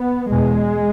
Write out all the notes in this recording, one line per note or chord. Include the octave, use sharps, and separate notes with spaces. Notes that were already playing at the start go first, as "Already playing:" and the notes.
Already playing: B3
E2 B2 G#3